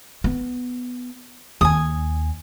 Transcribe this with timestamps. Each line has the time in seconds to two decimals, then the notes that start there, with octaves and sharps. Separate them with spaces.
0.24 B3
1.61 D#2 G#5 D#6